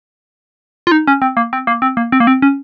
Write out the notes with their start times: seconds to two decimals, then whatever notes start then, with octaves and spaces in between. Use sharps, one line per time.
0.87 F4
0.92 D#4
1.07 C#4
1.22 C4
1.37 A#3
1.53 C4
1.67 A#3
1.82 C4
1.97 A#3
2.12 C4
2.20 A#3
2.27 C4
2.42 C#4